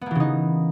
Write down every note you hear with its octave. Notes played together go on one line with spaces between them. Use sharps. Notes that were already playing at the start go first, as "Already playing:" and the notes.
C#3 E3 A#3 B3 D#4